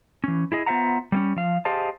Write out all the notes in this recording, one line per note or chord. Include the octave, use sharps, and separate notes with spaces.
E3 C#4
E4 G#4 D#5
B3 F4 C5 E5 F#5 A#5
G3 A#3 C#4
F3 F5
G4 G#4 C5 D#5 F5 A5